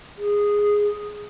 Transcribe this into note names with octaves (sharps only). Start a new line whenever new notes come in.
G#4